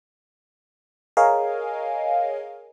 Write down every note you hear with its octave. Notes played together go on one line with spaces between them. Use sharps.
G#4 A#4 C#5 D#5 F5 G#5